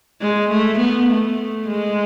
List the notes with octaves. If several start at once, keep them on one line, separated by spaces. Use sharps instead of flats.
G#3
A3
B3
A3
G#3